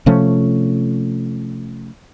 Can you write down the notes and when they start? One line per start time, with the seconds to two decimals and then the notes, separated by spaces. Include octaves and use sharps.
0.06 C3 F3 A3 C#4